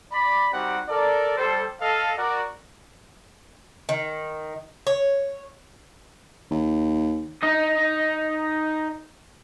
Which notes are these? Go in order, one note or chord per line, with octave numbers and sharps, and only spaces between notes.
D5 B5
G3 C4 D#4 F#4 G4 F#5
A4 A#4 D5
G3 A4 C5
A4 D#5 F5
F#4 A#4 D5
D#3
C#5
D#2
D#4 D#5